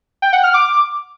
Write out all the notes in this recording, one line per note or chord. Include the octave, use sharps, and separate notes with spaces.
G5
F#5
F6
D6